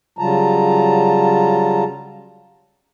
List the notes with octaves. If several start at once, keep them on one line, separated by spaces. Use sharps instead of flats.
C#3 F#3 G3 F4 A5 A#5